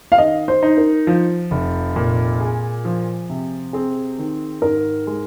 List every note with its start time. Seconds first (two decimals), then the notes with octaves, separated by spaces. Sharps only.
0.12 F5
0.18 D#3 D#5
0.48 C5
0.63 D#4
0.77 A#4
1.07 F3 F4
1.51 F1
1.96 A#2
2.40 G#4
2.85 F3
3.30 C3
3.73 C4 G#4
4.18 D#3
4.62 G#2 A#4
5.07 G#3